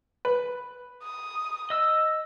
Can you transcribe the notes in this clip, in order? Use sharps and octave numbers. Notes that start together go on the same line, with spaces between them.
B4
D#6
D#5 E6